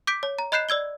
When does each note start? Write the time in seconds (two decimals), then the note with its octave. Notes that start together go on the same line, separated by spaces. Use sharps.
0.07 D6 G6 B6 D7
0.23 C#5
0.39 A#5
0.52 D#5 B5 F#6 G6 C7 E7
0.69 D5 E6 G#6 G7